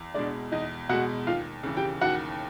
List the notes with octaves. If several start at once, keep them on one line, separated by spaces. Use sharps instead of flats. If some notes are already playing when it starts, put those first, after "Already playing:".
Already playing: E2
B2 G#3 D4 D5
E2 D#4 D#5
B2 G#3 F#4 F#5
D#2 F4 F5
C#3 E3
G4 G5
D#2 F#4 F#5